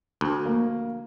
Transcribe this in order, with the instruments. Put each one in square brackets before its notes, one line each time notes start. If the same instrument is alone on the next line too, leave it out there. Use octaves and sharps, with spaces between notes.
[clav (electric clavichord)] D2
[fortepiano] A#3